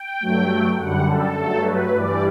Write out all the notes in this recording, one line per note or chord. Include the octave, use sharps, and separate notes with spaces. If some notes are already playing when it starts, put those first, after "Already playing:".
Already playing: G5
G2 F#3 A3
F#2 D3 G3 F#5
A4
G2 F#3 A3
B4
G2 E3 G3 D5